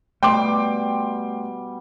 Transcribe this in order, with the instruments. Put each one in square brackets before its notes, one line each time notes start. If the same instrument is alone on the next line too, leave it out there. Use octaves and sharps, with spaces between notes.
[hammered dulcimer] B2 G3 [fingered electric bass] A3 [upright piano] G5 C6 D6